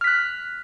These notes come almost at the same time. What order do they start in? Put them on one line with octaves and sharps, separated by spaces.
F6 B6 F#6